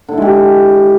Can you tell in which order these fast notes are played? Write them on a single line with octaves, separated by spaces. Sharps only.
D3 E4 G#3 G4